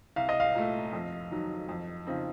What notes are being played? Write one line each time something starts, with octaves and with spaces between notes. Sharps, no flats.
C2 F5
D#5
F5
A#2 A3
F2
D#3 F#3
F2
C#3 F3 C4 D#4